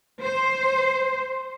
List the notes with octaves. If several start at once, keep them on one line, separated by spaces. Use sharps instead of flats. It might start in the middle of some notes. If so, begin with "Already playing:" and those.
C5